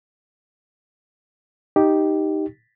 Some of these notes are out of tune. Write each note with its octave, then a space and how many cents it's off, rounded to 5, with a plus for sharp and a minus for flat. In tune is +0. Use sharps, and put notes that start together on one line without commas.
D#4 +0 G4 +0